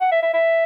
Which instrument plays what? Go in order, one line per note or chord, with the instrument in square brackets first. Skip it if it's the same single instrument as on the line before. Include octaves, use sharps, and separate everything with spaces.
[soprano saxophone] F#5
E5
E5
E5